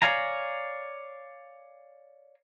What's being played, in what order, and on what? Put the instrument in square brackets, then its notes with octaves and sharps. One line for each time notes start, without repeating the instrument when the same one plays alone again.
[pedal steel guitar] C#5 D5 F5 G#5 A#5